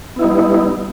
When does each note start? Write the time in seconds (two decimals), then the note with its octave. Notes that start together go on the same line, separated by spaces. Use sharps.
0.16 B3
0.19 E4
0.21 D#4
0.24 G3